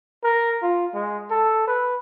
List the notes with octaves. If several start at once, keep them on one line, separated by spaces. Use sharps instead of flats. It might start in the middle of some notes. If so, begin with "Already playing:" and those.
A#4
F4
G#3
A4
B4